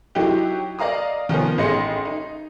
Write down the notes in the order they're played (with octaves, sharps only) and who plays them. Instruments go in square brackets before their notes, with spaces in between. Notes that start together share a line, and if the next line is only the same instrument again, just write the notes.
[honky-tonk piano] F#3 D#4 E4 G4
D5 D#5 F5 A#5 D#6
D#3 F3 B3 C#4
A1 G#3 D#5 C6 C#7
D#4